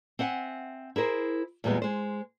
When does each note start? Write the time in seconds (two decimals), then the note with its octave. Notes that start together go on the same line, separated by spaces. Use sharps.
0.19 C4 E5 F#5 G#5
0.96 E4 G#4 A#4 C5
1.64 E2 A#2 G3 G#3 B3
1.82 G#3 C5